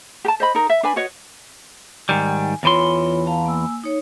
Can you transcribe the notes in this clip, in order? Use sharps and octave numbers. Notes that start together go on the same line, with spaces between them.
G4 A5
C5 D#5 B5
D#4 A#4
E5
D4 B4 G#5 B5
F#4 B4 C#5 D#5
G#2 D#3 G3 G#5
E2 E3 F4 C#5 B5 C6
F5 A5 A#5
A#3 G#5 E6
D#4 C#5